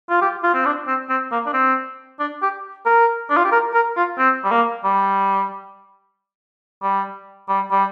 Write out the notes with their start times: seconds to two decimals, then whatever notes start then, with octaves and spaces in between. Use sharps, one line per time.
0.10 F4
0.22 G4
0.43 F4
0.54 C4
0.66 D4
0.87 C4
1.10 C4
1.32 A#3
1.46 D4
1.54 C4
2.20 D4
2.42 G4
2.86 A#4
3.30 D4
3.37 F4
3.45 G4
3.52 A#4
3.74 A#4
3.97 F4
4.19 C4
4.44 G3
4.51 A#3
4.84 G3
6.83 G3
7.49 G3
7.72 G3